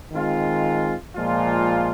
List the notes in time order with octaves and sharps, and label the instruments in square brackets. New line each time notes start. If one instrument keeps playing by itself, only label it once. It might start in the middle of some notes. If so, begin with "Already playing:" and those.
[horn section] D#3 G#3 C4 F4
A#2 F3 G#3 F4